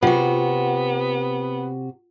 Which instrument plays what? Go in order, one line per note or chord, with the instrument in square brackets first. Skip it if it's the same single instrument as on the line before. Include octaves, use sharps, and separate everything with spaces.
[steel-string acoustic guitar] C3 F#4 [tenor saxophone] B3 [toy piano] F4 F#5